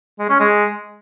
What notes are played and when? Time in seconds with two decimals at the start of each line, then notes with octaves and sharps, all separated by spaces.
0.19 G#3
0.29 C#4
0.40 G#3